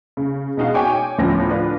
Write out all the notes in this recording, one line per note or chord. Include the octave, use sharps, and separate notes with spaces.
C#3
B2 G#3 D#4 F#4 F5
C#5 G5 G#5 C#6 D6
D2 A2 F3 B3 C#4 A#6
D4 F4 B4